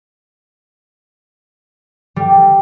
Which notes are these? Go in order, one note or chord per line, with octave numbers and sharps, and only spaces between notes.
G3